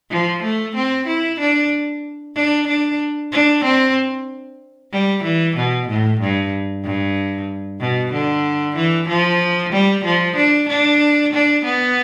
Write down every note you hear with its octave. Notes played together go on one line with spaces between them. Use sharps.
F3
A3
C4
E4
D4
D4
D4
D4
C4
G3
E3
B2
A2
G2
G2
B2
D3
E3
F3
G3
F3
D4
D4
D4
B3